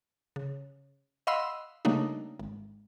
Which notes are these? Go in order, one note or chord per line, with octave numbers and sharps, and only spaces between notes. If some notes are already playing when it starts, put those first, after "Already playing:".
C#3
D#5 F5 F#5 B5 C6 E6
C#3 G3 A3 A#3 D4 D#4
G#1